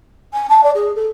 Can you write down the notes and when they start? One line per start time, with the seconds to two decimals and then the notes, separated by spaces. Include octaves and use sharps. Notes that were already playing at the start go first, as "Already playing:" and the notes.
0.33 G#5
0.49 A5
0.63 D5
0.74 G#4
0.95 A4